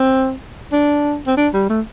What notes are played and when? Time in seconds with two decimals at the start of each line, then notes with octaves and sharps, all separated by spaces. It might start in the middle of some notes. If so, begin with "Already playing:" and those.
Already playing: C4
0.72 D4
1.27 C4
1.37 D4
1.54 G3
1.70 A3